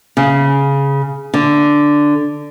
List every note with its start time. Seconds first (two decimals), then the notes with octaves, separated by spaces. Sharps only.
0.17 C#3
1.34 D3